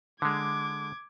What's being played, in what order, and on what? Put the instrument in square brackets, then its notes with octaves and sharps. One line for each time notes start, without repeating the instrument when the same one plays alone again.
[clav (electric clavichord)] D3 G#3 [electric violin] D6 G#6